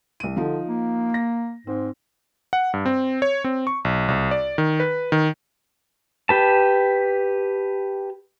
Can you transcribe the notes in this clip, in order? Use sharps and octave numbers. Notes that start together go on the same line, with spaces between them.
C2 D#7
D3 F3 D#4
A#3
A#6
G#2 C4
F#5
G2
C4
C#5
C4
C#6
B1
C2
D5
D#3
B4
D#3
G4 B4 A5